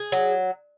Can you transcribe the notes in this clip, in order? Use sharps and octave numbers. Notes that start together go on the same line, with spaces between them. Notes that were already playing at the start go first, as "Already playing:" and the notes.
Already playing: G#4
F#3